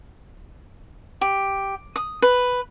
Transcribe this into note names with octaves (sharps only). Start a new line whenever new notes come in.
G4
D#6
B4